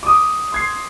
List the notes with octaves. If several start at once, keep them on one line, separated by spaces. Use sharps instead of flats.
D6 D#6
C6 G#6 C7